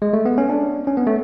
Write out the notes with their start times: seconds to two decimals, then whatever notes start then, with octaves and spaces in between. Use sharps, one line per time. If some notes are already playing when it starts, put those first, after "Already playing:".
0.02 G#3
0.13 A3
0.25 B3
0.38 C#4
0.50 D4
0.87 C#4
0.97 B3
1.07 A3